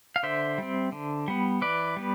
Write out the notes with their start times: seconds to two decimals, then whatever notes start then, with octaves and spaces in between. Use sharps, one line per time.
0.16 F5
0.23 D3 C5 E5
0.58 G3 C4
0.92 D3
1.28 G3 B3
1.61 E3 B4 D5
1.97 G3 B3